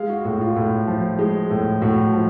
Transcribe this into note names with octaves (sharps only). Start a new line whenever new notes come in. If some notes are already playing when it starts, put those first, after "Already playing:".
Already playing: G#3 F5
F#4
A2 F#4
F4
A2
F3
G#3
A2
A2 F#4
F3